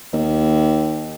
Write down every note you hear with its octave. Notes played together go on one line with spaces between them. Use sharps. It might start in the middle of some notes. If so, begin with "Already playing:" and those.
D#2